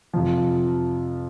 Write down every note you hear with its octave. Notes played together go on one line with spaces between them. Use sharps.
F2 C3 F3